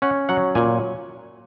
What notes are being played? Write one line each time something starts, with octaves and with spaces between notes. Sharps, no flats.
C#4 F#5
F#3 F#5
A#2 G#5